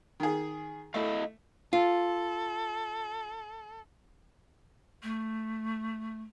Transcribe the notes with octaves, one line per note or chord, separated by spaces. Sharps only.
D#3 G#4
A3 E4 D#5 F5
F4 A4
A3